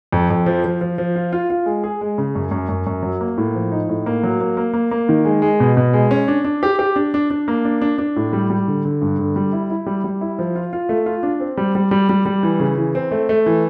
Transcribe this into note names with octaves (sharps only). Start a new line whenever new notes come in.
F2
F2
F3
F3
F3
F3
F4
F4
F4
G#3
G#4
G#3
C#3
F#2
F#2
F#2
F#2
F#3
A#3
A2
F3
D#4
A2
A#3
F#3
A#3
A#3
A#3
A#3
D#3
G#3
G#3
B2
B2
G#3
C#4
D4
D4
G4
G4
D4
D4
D4
A#3
D4
D4
D4
A2
G3
G3
D3
D3
G2
D3
G3
E4
E4
G3
G3
E4
F3
F4
F4
A3
F4
D4
C4
G3
G3
G3
G3
G3
E3
C#3
E3
C4
A3
A3
E3